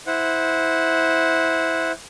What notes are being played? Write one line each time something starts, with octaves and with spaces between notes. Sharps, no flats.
E4 C5 F#5